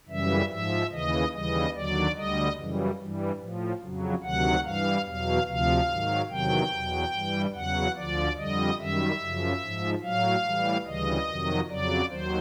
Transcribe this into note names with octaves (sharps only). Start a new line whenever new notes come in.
F#2 C#3 E3 G3 E5
G#2 F3 E5
D#2 C#3 E3 D#5
D#2 C#3 E3 G3 D#5
D#2 D3 F#3 D5
D2 D3 G3 D#5
F#2 C#3 E3 G3
G2 E3 G3
A2 F3
F2 C#3 F#3
D2 C3 D#3 F#3 F#5
G2 E3 G3 F5
E2 B2 F#3 F5
D2 C3 F3 F5
G#2 D#3 F#3
E2 C3 D#3 F#3 G5
E2 B2 F#3
G2 E3 G3
E2 C#3 F#3 F#5
D2 D3 F3 D5
F2 D3 G3 D#5
F#2 D#3 G3 E5
F#2 C#3 F3
G#2 F3
A2 F#3 F5
A2 E3 G3
D2 C#3 E3 G3 D#5
F2 C3 D#3 F#3
F2 C#3 F#3 D5
D#2 D#3 F#3 C5